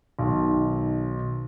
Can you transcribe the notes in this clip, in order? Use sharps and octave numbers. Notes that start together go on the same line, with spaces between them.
B1 D#3